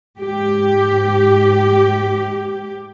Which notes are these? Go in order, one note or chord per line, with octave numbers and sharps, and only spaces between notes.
G#2 G4